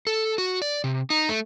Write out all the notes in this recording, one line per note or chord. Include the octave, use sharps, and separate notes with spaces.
A4
F#4
D5
C3
D#4
A3